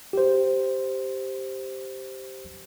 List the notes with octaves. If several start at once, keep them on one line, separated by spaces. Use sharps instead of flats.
G4 C5